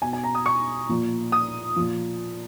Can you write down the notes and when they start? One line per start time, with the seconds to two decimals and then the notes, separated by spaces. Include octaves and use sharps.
0.02 B2 G#5
0.13 G#5
0.24 A#5
0.35 D#6
0.46 C#6
0.89 A#2 F3
1.32 D#6
1.76 A#2 F3